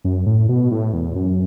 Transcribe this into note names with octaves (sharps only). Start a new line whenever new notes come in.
F#2
A2
B2
A2
E2
F#2